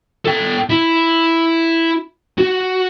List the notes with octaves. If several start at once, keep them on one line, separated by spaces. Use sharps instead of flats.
A4 G5
E4
F#4